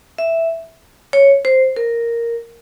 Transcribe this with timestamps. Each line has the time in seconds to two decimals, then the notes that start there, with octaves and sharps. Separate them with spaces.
0.18 E5
1.13 C#5
1.45 C5
1.76 A#4